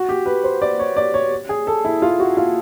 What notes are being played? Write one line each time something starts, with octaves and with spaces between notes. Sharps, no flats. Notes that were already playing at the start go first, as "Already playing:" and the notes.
Already playing: F#4
G4
B4
C5
D5
C#5
D5
C#5
G#4
A4
E4
F4
F#4
F4